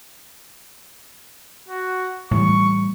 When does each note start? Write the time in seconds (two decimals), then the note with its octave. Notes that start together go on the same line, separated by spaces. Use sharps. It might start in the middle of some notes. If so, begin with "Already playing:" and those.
1.69 F#4
2.31 A2 E3 G3 C#6